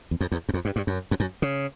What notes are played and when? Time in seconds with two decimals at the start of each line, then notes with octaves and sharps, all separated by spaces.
0.11 E2
0.21 F2
0.32 E2
0.49 F#2
0.54 F2
0.65 G2
0.76 G2
0.87 F#2
1.11 F2
1.20 F#2
1.42 C#3